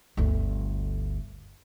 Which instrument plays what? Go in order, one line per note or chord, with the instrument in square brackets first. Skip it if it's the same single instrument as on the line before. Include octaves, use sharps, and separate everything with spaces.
[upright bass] G1 D2